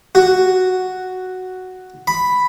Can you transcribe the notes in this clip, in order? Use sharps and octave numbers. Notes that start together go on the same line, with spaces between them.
F#4
B5